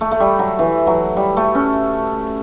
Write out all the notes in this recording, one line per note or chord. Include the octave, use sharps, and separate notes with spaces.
A3
A3
G3
F#3
E3
F#3
G3
A3
C#4